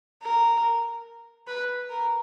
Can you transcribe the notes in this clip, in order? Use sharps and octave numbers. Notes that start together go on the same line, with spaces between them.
A#4
B4
A#4